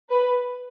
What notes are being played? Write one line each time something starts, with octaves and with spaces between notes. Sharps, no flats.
B4